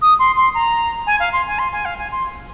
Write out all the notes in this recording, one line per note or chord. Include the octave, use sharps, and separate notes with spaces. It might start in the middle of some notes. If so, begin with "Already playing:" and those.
D#6
C6
C6
A#5
G#5
F5
C6
G#5
C6
G#5
F5
G#5
C6